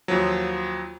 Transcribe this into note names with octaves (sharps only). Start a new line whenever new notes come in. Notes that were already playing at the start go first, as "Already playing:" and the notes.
D#2 F3 F#3